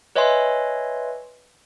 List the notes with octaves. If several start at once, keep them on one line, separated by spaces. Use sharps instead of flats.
B4 C#5 D#5 E5 G#5 C6